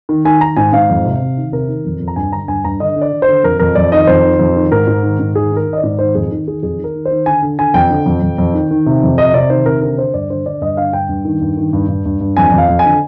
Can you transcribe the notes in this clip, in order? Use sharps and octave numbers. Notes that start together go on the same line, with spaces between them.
D#3
D#3 G#5
D#3 A#5
G#2 G#5
G#2 F5
F2
C3
C3
D#3
C3 A#4
D#3
F2
F2
A#5
G2 G#5
D3 A#5
G2 G#5
G2 A#5
D3 D#5
D3
D5
D3
C5
D3
F2 A#4
F2 A#4
F2 D5
D#3 D#5
F2 C5
D#3
F2
D#3
G#2 A#4
G#2
D#3
G#2
D#3 G#4
D#3 A#4
D#3
D#5
D5
G#2
D#3 C5
F2 G#4
D#3
D#3 G#4
F2 G#4
D#3
A#4
D#3
C5
D#3
D3 G#5
D3
D3 G#5
F2 G5
D3
F2
F2
F2
D#3
D#3
C3
F2
C3 D#5
C3 D5
D#3 C5
C3 A#4
D3 A#4
D3 C5
G2 D5
D3 C5
D3 D5
G2 D#5
D3 F5
G2 G5
G2
D#3
G2
D#3
G2
G2
G2
G2
F2 G#5
F2
F5
F2
G#5
D3